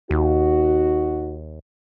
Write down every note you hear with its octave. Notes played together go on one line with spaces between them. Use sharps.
D#2 D#4 F#4